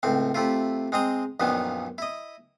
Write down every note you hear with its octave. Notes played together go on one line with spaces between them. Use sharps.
C#2 A2 C4
C3 A3 E4 F4
G#3 C4 D#5 A#5
A#1 F#2 A#2 D#3 B3
E4 D#5